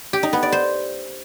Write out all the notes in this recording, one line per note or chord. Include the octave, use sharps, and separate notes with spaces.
G4
D#4
B3
D5
C5